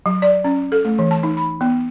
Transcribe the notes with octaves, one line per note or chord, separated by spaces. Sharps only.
F#3
D5
C#4
A4
A3
E3
A5
D#4
B5
B3